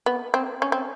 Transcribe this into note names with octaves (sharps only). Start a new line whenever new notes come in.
B3
C4
C#4
C4